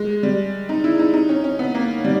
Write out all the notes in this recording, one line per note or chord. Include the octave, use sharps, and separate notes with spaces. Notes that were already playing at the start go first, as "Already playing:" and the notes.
Already playing: G#3
G3
D#4
E4
D#4
D#4
C#4
C#4
B3
A#3
G3